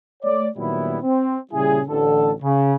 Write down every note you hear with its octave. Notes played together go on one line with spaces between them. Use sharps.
A3 C#5 D5
A#2 D#3 F#3 G3 B3 E4
C4
A#2 C#3 G3 E4 G#4
A1 D3 A4
C#3